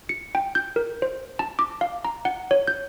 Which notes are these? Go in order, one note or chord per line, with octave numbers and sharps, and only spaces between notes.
C#7
G5
G6
A#4
C5
A5
D6
F5
A#5
F#5
C#5
G6